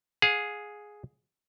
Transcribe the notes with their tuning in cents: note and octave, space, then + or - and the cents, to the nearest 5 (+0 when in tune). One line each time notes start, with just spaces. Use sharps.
G#4 +0 F5 +45